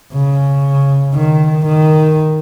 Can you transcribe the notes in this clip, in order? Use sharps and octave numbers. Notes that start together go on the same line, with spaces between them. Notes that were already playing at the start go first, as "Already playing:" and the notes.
C#3
D#3
D#3